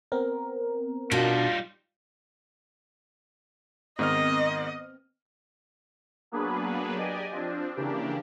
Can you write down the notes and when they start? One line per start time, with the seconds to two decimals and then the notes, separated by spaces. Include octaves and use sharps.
0.12 B3 C4 A#4
1.12 B2 G3 D4 D#4 F4
3.99 G#2 D#3 B3 C4 D#5 F6
6.32 F#3 A#3 B3 D4 G#4 B4
6.95 G4 D5 D#5 G#5
7.32 F3 C4 D4
7.76 C#3 E3 A#3 D4 G4